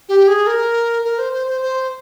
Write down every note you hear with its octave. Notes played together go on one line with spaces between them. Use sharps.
G4
G#4
A#4
A#4
C5
C5
C5
C5